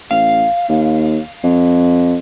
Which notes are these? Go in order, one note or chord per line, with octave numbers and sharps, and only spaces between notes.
A1 F5
D#2
F2